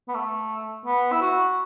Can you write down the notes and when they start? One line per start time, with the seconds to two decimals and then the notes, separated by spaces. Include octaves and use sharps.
0.08 B3
0.15 A3
0.86 B3
1.12 E4
1.21 F#4